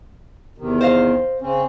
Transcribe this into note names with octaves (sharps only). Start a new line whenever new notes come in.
E2 C3 D#3
C5 D#5 F5
C#3 C4 C#4